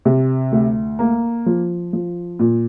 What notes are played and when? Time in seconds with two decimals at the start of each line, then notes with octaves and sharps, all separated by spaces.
0.05 C3
0.52 D2
0.99 A#3
1.46 F3
1.93 F3
2.39 A#2